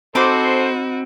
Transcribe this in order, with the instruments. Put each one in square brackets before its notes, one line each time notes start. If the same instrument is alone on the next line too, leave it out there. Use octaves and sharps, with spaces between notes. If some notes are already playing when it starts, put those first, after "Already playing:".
[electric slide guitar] C4 [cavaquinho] D#4 B5 D6 [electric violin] F#4 [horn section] A4 C5